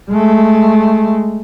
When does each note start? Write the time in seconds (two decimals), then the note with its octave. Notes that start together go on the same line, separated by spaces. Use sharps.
0.11 G#3 A3